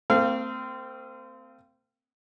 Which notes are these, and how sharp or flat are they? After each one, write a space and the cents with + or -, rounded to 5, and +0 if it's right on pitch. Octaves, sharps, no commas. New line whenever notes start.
A3 +45 C4 -20 F5 -25